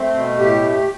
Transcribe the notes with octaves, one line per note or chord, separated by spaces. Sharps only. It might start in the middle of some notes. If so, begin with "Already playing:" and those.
Already playing: A3 C4
B2
A2 G4
A3